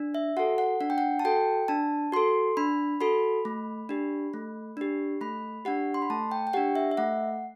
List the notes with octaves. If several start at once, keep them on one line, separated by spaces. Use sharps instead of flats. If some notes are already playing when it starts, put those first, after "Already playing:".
Already playing: D4
E5
F#4 A4 F#5
F#5
D4 F#5
G5
F#5
A5
F#4 A4 G5
D4 A5
F#4 A4 C6
D4 B5
F#4 A4 B5
A3
D4 G4
A3
D4 G4
A3 B5
D4 G4 F#5
C6
B5
A3 A5
G5
G5
D4 G4 F#5
E5
E5
A3 F#5